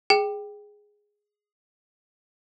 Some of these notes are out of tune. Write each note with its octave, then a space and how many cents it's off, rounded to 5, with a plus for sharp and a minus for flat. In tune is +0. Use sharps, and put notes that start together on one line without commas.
G#4 +0 G5 +0